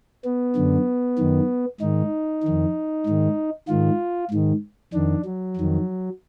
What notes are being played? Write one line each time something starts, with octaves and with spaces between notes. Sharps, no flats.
B3
F#2 D3
F#2 D#3
G#2 D#3 D#4
F2 D#3
G#2 D#3
G#2 D#3 F4
G#2 D#3
F2 D#3 D4
F#3
F2 D#3